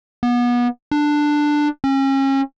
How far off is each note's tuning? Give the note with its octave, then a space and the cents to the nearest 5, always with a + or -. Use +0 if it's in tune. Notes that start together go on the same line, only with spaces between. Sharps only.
B3 -30
D4 +10
C#4 -35